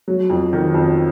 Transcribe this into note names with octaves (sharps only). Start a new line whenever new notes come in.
F#3
F2
D#3
F2